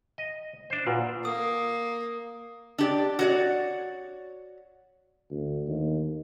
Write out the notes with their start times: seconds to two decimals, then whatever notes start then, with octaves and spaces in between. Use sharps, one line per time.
0.18 D#5
0.70 D4 C5
0.87 A#2 F4 B4 F#5
1.25 A#3 D#6
2.78 D4 G4 D5
3.19 F#4 C#5 D5
5.30 D2
5.68 D#2